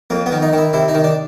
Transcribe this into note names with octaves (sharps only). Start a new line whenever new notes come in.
F2 A#3
B3
D#3
D#4
D#3 E4
C3 E4
D#4
D#3
D4